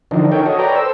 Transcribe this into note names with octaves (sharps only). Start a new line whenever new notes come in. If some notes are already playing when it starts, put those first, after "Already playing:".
D3 E3 F3 D4 D#4
D#4 A4 A#4 C#5 G5
F#4 A4 C#5 D#5
B4 C#5 D5 G5 A#5
A4 C5 E6